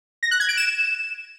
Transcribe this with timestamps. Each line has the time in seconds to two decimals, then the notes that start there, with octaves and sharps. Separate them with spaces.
0.23 A#6
0.31 F#6
0.40 G#6
0.49 D7
0.57 E7